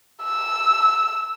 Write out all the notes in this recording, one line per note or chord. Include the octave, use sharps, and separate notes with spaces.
E6